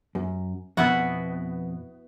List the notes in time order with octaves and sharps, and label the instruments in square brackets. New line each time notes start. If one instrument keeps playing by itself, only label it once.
[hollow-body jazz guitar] F#2
[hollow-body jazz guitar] F2 B2 [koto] B3 E4 F#4